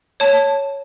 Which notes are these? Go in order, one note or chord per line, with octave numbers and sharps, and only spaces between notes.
C#5 A5